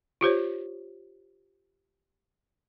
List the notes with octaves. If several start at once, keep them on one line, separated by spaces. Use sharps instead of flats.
F4 G4 C5 C#5